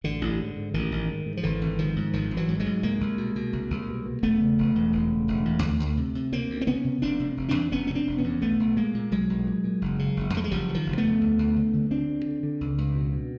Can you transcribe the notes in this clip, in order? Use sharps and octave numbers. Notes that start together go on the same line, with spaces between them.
A1 D3
A1
G#2
G#2
A1 D#3
A1
G#2
G#2
F3
G#1 D3 E3
G#1
G#2 D#3 F3
G#2
G#1 D#3 F3
G#1
E3 F#3
G#2
F#3 G#3
G#2
C2 G#3 A#3
C2
B2
B2
C2
C2
B2
B2
E1 A3 B3
C#3
E1
E2
E1
C#3
E1
E2
D2
D2
C3
C3
D2 A#3 C4
D2
C4
C3 B3 C#4
C3
F1 C4 D4
C3
F1
C4 D4
E2
F1 B3 C#4
C3 C#4
C4 D4
F1
B3 C#4
E2
B1 A3 B3
B1
A#2 G#3 A#3
A#2
B1 F#3 G#3
B1
A#2
A#2
F#1
C#3
F#1
F2 A3
G#3
F#1 F3 G3
C#3
D#3 F3
F#1
A3 B3
F2
D2
D2
D3
D3
D2 C4 D4
D2
D3
D3
C#2
C#2
B2
B2